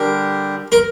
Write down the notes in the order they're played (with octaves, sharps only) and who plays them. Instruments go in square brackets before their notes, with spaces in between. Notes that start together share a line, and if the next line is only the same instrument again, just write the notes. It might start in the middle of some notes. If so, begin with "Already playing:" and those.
Already playing: [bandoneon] D3 G3 D4 G4 [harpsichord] A#4
[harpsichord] A#4